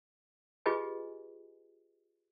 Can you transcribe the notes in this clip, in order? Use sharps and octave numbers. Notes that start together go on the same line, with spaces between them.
F4 G4 G#4 B4 D#5 G#5